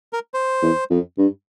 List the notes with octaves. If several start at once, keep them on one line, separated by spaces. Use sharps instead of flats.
A#4
C5
E2
F2
G2